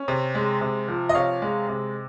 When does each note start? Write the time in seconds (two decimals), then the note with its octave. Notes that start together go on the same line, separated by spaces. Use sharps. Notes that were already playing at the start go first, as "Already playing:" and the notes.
Already playing: C#4
0.08 C3
0.35 G#3
0.61 C3
0.88 F3
1.09 D#5
1.15 C3 C#5 F5
1.42 G#3
1.69 C3